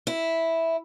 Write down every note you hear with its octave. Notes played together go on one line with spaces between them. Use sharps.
E4